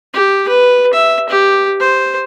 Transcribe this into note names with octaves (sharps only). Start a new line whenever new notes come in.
G4
B4
E5
G4
C5